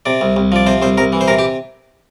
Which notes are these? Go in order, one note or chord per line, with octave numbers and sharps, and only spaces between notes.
C3 D5
C2
C2
F3 D5
C3 C5
C2 C5
C2 A#4
E3
C5
C3 A#4
G4